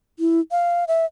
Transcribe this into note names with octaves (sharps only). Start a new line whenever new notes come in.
E4
F5
E5